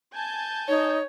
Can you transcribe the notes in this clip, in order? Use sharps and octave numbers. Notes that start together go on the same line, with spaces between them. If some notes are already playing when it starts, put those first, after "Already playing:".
G#5 A5 G6
D#4 C#5